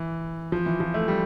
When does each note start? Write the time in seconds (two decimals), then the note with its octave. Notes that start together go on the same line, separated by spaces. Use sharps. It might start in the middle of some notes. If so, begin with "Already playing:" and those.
Already playing: E3
0.52 F3
0.66 E3
0.80 F3
0.94 A3
1.08 G3